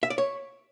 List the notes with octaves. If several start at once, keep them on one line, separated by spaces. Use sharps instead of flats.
E5
D5
C#5